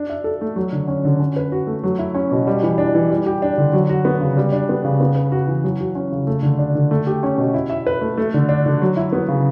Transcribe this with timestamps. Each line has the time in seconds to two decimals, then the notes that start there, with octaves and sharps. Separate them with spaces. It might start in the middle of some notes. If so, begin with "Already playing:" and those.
Already playing: D4
0.10 E5
0.24 A4
0.41 A3
0.56 F#3
0.72 D3
0.88 C#4
1.05 D3
1.20 C#4
1.36 B4
1.52 F#4
1.67 A3
1.83 F#3
1.99 E4
2.15 C#4
2.32 B2
2.47 G3
2.63 E3
2.78 D4
2.95 E3
3.10 G3
3.26 G4
3.42 D4
3.58 D3
3.73 F#3
3.89 F#4
4.05 B3
4.21 C#3
4.37 G3
4.52 D4
4.69 B3
4.85 C#3
5.01 B3
5.16 B4
5.32 F#4
5.47 E3
5.64 F#3
5.80 F#4
5.95 C#4
6.12 C#3
6.27 A3
6.43 D3
6.59 D4
6.75 D3
6.91 A3
7.07 G4
7.23 C#4
7.38 B2
7.54 E4
7.70 E5
7.87 B4
8.01 A3
8.17 A3
8.34 D3
8.49 D4
8.66 D3
8.82 F#3
8.97 E4
9.13 B3
9.28 C#3